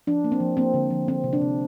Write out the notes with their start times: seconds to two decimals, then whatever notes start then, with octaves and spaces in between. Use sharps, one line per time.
0.07 F3 D4
0.24 A#3
0.32 C4
0.40 F3
0.57 A#3 C4
0.74 D3
0.90 F3
1.07 F3 C4
1.24 C3
1.33 D4
1.41 C3